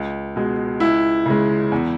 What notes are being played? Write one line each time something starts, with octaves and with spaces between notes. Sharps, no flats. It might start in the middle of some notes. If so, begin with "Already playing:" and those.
Already playing: C#2
B2 G#3
C#2 E4
C#3 G#3
E2